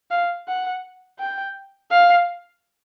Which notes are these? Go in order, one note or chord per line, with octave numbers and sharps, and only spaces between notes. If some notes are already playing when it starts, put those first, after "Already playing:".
F5
F#5
G5
F5